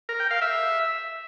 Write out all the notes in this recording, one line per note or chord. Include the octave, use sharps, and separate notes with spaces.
A#4
G5
F5
E5